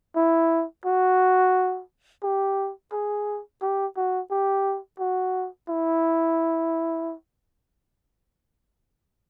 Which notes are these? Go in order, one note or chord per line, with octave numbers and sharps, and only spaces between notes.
E4
F#4
G4
G#4
G4
F#4
G4
F#4
E4